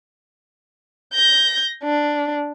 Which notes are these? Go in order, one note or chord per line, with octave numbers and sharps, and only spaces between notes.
G6 A#6
D4